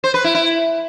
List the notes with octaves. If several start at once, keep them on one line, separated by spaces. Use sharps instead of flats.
C5
B4
E4
E4